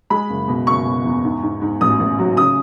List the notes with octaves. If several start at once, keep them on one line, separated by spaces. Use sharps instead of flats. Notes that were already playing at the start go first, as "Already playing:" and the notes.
G#3 B5
F#1
B2
F#1 C#6
B2
E2
G#2
G#2
G#2
A1 D#6
A1
F#3
C#3 D#6